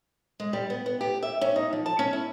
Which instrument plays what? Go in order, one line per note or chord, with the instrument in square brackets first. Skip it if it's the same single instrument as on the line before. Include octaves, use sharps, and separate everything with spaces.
[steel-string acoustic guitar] G#3
G3
B3
B3
G4
E5
C#4
D#4
F3
A5
C#4
E4